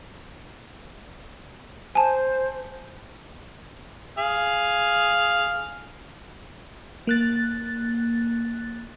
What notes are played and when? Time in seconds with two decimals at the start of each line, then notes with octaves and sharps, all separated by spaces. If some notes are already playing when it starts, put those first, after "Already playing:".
1.95 C5 G#5 A5
4.18 G#4 F5
7.07 A#3 F#6 A6